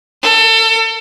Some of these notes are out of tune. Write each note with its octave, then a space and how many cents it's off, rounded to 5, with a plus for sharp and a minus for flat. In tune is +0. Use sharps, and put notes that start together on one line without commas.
A4 +30